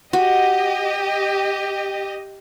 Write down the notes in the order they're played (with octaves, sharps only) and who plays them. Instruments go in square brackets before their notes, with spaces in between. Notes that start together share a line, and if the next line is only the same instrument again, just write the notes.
[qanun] F#4 [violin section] G4 D#5